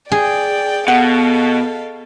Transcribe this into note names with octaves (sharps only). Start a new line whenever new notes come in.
G#4 D5 G5
B2 A4 F5 F#5